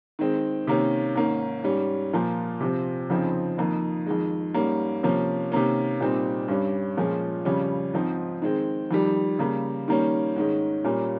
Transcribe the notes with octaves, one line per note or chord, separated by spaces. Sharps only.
D#3 G#3 C4
C3 D#3 A#3 C#4
G#2 D#3 A#3 C#4
G#2 G3 C#4
A#2 F3 A#3
C3 F3 C4
F2 C#3 F3 C4 D#4
F2 D#3 A#3 D#4
F2 D#3 G#3
G#2 G3 A#3 C#4
C3 F3 A#3 C#4
C3 D#3 A#3 C#4
A#2 G3 C4 D#4
G2 G3 C#4
A#2 F3 G#3 C#4
F2 C#3 G3 C#4
G#2 F3 C4 D#4
D#3 G#3 C4
F2 D#3 G3
C#3 G3 A#3
D#3 G3 A#3 C#4
G#2 D#3 G#3 C#4
A#2 G3 A#3 C#4